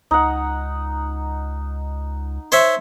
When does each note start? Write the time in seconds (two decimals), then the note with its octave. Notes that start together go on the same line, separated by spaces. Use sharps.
0.11 C#2 D#4 F#5
2.52 C5 C#5 E5